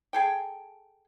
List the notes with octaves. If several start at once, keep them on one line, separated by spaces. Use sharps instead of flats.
G#4 A4 G5